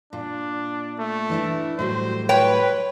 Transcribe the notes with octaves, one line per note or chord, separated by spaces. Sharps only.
A#2 D4
A3
E3 D4 E4
A2 F#3 G3 C5
B4 C#5 G5